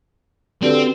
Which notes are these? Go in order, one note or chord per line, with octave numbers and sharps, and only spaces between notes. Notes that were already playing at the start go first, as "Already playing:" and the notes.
D3 C4 F#4 G4 B4